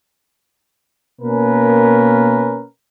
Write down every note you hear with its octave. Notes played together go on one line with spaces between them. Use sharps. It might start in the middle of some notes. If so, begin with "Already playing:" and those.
B2 A#3 C#4 A#4 B4